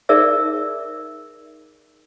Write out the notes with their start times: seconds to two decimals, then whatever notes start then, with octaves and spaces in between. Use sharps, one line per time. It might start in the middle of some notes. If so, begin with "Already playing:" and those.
0.09 D#4 G#4 A#4 D5 E5 E6